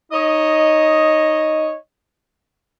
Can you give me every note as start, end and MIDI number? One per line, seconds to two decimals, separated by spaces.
0.12 1.75 63
0.12 1.75 73
0.12 1.75 75